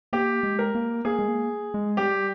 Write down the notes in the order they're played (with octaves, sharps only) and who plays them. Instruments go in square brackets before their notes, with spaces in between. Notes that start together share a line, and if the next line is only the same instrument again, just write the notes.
[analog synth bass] A#3 [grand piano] G4
[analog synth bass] G#3
[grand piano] A#4
[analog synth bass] A#3
[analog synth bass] A#3 [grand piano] G#4
[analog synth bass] G#3
A#3
G#3
[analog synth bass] G3 [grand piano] G4